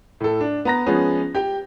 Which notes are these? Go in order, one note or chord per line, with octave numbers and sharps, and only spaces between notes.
A2 A4
D4
B3 A#5 A#6
F3 G#3 B3 C#4 G#4
G4 G5